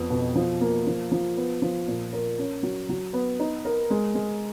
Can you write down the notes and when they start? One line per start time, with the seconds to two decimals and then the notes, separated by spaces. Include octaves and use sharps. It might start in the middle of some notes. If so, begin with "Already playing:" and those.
Already playing: F2 B3
0.10 B2
0.35 F3
0.61 A#3
0.87 F3
1.12 F3
1.37 B3
1.62 F3
1.88 A#2
2.13 A#4
2.38 C#4
2.63 F#3
2.89 F#3
3.13 B3
3.39 D#4
3.65 A#4
3.90 G#3
4.15 G#3